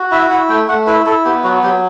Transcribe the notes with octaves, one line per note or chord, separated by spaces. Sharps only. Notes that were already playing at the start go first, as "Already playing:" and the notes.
Already playing: F#4
E4 E5
E4 F#5
A3 G5
A3 F#5
E4 B4
E4 A4
B3 G4
F#3 F#4
F#3 G4